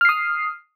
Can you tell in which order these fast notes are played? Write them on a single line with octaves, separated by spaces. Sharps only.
F6 C7 D#6